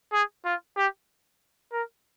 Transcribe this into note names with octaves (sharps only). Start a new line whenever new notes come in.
G#4
F4
G4
A#4